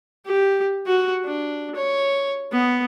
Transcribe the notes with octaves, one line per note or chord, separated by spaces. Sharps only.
G4
F#4
D4
C#5
B3